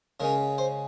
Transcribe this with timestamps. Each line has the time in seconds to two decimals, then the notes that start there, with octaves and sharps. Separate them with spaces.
0.20 C#3 G#3 C#4 A#4
0.58 C5